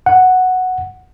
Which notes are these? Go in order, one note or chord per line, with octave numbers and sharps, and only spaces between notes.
F#5